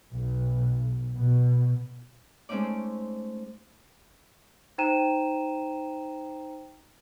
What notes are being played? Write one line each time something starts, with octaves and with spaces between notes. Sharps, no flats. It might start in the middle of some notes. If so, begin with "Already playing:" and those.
B1
B2
G#3 A3 C4 C#4 D#4 D5
D#4 C5 G5 A#5 D#7 E7